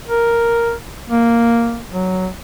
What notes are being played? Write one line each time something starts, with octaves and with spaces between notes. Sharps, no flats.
A#4
A#3
F#3